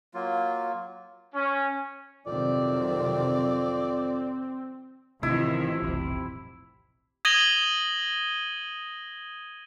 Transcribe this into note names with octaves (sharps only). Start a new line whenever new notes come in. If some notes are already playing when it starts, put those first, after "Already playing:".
F#3 A#3 F4
C#4
F2 C3 D#3 F#3 C4 D5
A1 C3 D#3 F3 E4
F1 B1 C3
D#6 G#6 A#6 D#7 F#7 G7